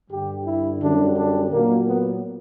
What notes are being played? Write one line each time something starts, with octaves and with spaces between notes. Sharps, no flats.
G2 D3 G3 G4
E4
F#2 D3 G3 D4
D4
A#2 F#3 A#3
B3